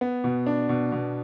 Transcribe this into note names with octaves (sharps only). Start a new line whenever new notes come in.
B3
B2
D4
B2
B2